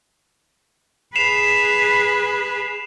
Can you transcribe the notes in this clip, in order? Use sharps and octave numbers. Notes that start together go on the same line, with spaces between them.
G#4 B4 C7 E7 F7